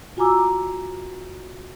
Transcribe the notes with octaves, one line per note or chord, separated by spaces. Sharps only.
F4 F#4 G#5 A#5 D6 E6